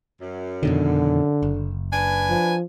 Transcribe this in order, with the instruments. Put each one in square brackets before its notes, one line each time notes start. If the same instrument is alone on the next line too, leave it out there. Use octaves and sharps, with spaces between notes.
[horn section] F#2
[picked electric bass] F2 B2 D#3 [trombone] D3
[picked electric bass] F#1
[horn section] D4 B4 G#5
[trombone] F3